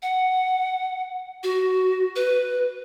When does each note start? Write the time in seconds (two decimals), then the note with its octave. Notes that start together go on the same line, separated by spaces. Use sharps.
0.02 F#5
1.43 F#4
2.16 B4